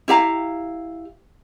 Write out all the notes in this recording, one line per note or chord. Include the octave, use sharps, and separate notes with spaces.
E4 G4 F5 A#5